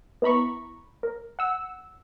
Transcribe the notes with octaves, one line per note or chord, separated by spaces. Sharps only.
B3 E4 A#5 B5 C#6
A#4
F#5 E6